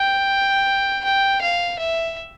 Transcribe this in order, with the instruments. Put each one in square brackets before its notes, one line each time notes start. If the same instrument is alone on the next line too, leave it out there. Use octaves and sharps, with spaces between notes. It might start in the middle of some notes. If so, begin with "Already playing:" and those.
Already playing: [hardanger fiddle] G5
G5
F5
E5